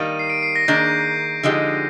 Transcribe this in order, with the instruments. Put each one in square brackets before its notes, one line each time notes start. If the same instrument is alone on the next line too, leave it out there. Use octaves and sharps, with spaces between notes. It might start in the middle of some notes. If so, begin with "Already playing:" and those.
Already playing: [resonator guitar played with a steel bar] D#3 G3 A#3 [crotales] D#7
[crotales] C7
D7
C7
A#6
[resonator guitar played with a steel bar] D#3 A#3 D4 G#4 [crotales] G6
[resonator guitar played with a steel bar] D3 F3 G#3 D#4 G4